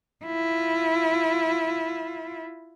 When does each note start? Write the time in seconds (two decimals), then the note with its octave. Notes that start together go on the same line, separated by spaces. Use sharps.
0.25 E4 F4